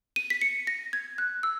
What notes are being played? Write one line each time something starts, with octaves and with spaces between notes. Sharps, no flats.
D#7
B6
C#7
A#6
G#6
F#6
E6